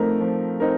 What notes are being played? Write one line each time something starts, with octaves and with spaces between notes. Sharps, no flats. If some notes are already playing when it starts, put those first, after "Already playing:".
Already playing: F3 A3 C4 D#4 A#4
F3
C4 D#4 A#4